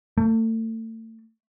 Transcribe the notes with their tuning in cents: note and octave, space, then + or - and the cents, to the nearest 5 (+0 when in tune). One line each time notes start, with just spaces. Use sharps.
A3 +35